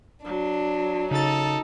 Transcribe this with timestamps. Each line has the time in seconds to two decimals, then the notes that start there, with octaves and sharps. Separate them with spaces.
0.25 F#3 D4
1.11 C#3 D#4 A4 A6